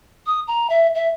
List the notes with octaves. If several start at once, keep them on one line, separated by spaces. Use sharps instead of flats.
D#6
A#5
E5
E5